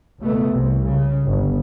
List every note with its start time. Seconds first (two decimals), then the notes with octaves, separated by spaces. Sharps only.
0.19 C#2 B2 A3 B3
0.50 C2 C3
0.85 C#3
1.26 G1